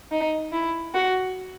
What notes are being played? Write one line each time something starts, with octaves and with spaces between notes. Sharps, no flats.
D#4
E4
F#4